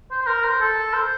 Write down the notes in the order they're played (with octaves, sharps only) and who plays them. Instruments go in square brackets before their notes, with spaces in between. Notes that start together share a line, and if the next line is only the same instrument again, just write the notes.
[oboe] C5
C5
A#4
C5
A4
C5